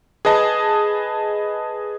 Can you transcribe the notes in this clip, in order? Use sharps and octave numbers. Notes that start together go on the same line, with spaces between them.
G#4 B4 D#5 A5